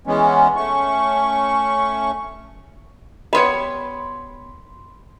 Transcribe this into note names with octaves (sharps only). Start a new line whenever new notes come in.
E3 G#3 B3 C#4
A3 C#4 C#6
G3 B3 C#5 B5 C6 D6